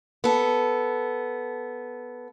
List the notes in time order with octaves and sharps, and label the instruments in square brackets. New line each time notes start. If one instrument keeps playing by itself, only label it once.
[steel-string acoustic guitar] B3 A4